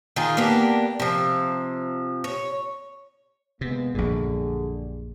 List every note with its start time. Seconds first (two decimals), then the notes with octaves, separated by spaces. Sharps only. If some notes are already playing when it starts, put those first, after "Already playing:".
0.16 D#3 F4 G#4
0.37 A#3 B3 D4 G4
1.00 C3 F3
2.24 C#5
3.61 C3 G#3 A#3 B3
3.95 A#1 F#2 A#2 D3 G3 G#4